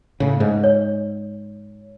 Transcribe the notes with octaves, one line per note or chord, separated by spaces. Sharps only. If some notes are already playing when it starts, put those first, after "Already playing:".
A2 C#3
G#2
C#5